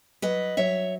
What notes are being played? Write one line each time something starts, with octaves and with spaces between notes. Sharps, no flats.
F#3 B4 D#5
F#3 C#5 E5